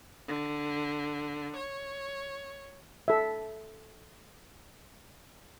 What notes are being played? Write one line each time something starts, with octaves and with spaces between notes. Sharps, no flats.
D3
C#5
A4 E5